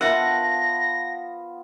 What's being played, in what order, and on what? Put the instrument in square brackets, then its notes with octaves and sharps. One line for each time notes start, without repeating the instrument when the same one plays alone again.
[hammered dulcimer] F3 B3 [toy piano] A#4 E5 [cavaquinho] F#5 A5 [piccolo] A#6